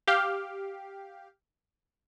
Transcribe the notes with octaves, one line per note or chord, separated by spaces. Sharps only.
G4 F5